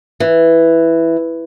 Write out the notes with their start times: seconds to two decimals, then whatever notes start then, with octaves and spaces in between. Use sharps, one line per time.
0.20 E3